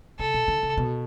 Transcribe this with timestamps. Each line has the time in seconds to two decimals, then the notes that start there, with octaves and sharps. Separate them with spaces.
0.19 C#3 A4
0.34 B2
0.48 D3
0.63 C#3
0.78 B2